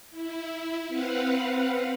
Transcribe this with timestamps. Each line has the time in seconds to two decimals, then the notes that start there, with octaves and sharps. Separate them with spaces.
0.11 E4
0.88 C4 B4 F5 F#5